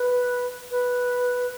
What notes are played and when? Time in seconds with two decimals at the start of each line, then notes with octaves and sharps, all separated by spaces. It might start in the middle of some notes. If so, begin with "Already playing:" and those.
Already playing: B4
0.71 B4